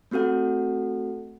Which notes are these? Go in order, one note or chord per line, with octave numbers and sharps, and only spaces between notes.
A3 C4 F#4 A4 F#5